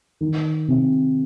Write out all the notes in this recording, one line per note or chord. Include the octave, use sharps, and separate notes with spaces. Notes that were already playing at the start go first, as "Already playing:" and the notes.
D#3
C3